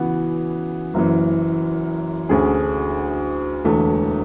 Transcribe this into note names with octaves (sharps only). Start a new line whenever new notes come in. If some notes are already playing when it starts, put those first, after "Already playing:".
Already playing: C#3 E3 B3 F#4
F#1 F#2 E3
D2 D3 A3 C#4 G#4
E1 E2 D3 A3